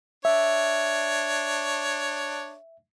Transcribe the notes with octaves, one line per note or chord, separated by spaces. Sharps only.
D4 C#5 E5